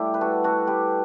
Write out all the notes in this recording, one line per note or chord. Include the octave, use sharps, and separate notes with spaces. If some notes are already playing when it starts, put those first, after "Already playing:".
Already playing: A2 G3 D4 E4 G4
B4
F#4 A4
F#4 A4
G4 B4